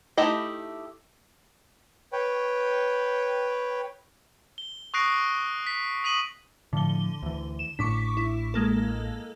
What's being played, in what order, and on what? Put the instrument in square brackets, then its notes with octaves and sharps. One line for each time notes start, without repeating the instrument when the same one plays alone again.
[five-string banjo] A3 D#4 E4 G4 D#5
[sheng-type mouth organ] B4 C#5 G5
[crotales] G7
C#6 D#6 F#6 A#6 C7 D7
B6
D#6 B6 D#7 F#7
[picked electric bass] A2 F3 [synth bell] D3 G7
[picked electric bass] D2 E3
[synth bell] E7
[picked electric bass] A1 A2 D4 [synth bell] C#6 D6 B6
[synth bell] E4
G#3 A#3 A4